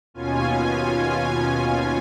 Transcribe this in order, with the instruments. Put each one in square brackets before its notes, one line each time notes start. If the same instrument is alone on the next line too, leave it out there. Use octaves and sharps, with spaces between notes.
[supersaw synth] D#2 B2 C#4 F4 G#5